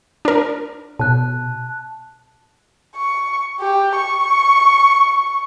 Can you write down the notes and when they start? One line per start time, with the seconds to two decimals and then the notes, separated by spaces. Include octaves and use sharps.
0.25 D4 A#4
0.99 B2 A5 F#6
2.96 C#6
3.61 G4
3.97 C#6